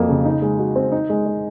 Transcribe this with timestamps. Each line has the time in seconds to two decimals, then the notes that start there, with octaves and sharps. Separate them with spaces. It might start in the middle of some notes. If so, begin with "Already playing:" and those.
Already playing: F2 F3 F#3 A#3
0.09 C#3
0.25 D#4
0.42 G#3
0.59 F#4
0.76 C4
0.92 D#4
1.09 G#3
1.26 G#3